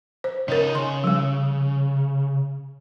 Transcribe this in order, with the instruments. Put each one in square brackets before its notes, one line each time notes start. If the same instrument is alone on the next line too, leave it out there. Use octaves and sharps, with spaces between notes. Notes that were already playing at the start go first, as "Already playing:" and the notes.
[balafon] C5
[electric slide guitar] C#3 D#4 [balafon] A#4 C#5
[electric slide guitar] C#3 [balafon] C6
[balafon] F3 G3